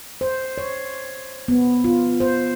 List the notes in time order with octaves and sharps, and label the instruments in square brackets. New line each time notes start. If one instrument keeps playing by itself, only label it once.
[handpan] C5
C#5
B3
F4
C5